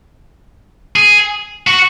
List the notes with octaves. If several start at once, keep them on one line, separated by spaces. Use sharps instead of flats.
G#4
F#4